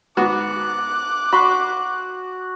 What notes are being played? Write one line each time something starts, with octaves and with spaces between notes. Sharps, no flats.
G#2 B3 F#4 D6 F#6
F#4 B5 C6